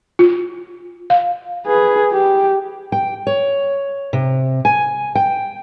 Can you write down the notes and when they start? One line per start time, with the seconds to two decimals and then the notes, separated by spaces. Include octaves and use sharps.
0.19 F4
1.10 F5
1.66 G#4 B4
2.12 G4
2.92 G5
3.27 C#5
4.13 C3
4.65 G#5
5.15 G5